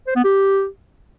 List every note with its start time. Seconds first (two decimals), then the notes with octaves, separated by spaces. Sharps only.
0.07 C5
0.16 B3
0.25 G4